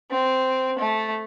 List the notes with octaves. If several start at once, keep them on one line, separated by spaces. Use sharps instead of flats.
C4
A3